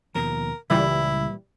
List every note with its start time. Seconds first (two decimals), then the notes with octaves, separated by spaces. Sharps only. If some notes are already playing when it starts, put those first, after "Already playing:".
0.15 D#2 B2 F3 A#4
0.70 C#2 A#2 C#3 E3 G3 E4